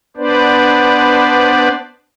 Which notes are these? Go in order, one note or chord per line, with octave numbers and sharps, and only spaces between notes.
B3 D4 B4 C5 D5